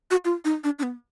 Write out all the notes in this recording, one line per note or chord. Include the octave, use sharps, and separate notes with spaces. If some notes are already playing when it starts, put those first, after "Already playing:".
F#4
F4
D#4
D4
D4
B3